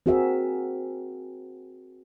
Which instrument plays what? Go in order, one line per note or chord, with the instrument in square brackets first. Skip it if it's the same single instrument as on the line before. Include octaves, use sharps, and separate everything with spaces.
[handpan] C4 F#4 G#4 A#4 E5